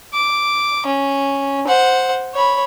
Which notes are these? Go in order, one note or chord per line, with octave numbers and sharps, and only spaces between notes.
D6
C#4
C5 F#5
C#5 B5